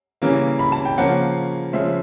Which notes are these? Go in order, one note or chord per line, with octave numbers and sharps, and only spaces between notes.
C#3 E3 G3 A#3 C#4
B5
A5
G5
C#3 F3 A#3 C#4 F#5
C#3 F3 G#3 C#4 E5